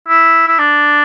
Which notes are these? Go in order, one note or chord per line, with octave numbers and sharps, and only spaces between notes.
E4
E4
D4